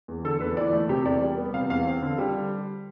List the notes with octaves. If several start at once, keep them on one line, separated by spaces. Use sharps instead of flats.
E2
D3 A4
E2 B4
E3 D5
A3
C3 G4
E2 D5
G3
B3
C3 F5
E2 F5
C4
D3
G3